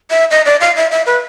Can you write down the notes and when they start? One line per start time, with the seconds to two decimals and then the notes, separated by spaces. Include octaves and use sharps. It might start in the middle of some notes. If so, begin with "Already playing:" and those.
0.10 E5
0.31 D#5
0.46 D5
0.61 F5
0.76 E5
0.91 E5
1.06 B4